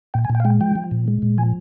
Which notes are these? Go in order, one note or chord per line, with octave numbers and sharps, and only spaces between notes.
A#2 G5
G#5
A#2
G5
F5
G#3 G5
F3 G5
F3
A#2
G#3
A#2
F3 G#5